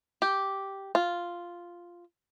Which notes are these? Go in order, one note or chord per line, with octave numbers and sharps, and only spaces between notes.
G4
F4